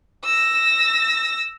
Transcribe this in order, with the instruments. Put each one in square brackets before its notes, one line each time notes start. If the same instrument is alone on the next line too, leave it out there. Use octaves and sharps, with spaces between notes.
[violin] E6 A#6